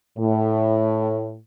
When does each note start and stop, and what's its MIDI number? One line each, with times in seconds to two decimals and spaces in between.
0.17 1.37 45